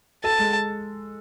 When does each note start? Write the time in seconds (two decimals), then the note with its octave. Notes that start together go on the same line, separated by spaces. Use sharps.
0.24 A4 A5
0.39 G#3